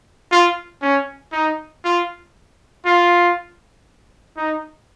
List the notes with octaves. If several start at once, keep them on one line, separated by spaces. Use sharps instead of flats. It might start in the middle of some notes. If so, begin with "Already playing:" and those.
F4
C#4
D#4
F4
F4
D#4